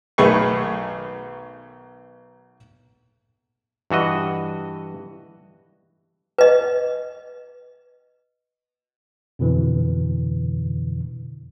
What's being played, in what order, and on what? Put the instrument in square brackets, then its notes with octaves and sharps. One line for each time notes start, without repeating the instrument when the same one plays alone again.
[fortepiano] B1 D#3 A3 G#4 B4 C#6
[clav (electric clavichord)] G2 E3 F#4 D#5
[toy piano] B4 D#5
[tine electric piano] F2 B2 D3 E3